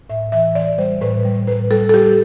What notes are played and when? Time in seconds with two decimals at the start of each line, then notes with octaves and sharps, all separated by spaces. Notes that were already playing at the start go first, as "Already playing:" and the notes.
0.09 A2 E5
0.32 E3 E5
0.55 E3 D5
0.78 G3 C5
1.02 A2 B4
1.25 G3
1.47 A2 B4
1.71 G3 A4
1.89 A4
1.94 G3 G4